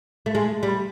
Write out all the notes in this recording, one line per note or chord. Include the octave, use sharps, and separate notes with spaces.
A3
G#3
G3